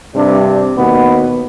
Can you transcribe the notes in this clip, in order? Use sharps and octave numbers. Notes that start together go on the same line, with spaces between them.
G2 C3 D4
D#2 B2 B3